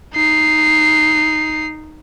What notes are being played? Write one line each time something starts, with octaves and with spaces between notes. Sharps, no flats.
D#4 C7